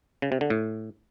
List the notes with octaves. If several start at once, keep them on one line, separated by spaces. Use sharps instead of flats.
C#3
C3
D3
A2